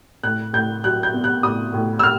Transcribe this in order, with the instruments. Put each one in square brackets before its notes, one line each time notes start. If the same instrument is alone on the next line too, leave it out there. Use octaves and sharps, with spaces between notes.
[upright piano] A2 F#6
A2 G6
F#3 F#6
G6
B3
F#6
A2 D#6
A2
E6
F6